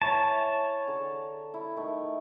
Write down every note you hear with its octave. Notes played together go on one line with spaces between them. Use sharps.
E3 C#5 G#5 A5
D3 A4 A#5
E4
D#3 A3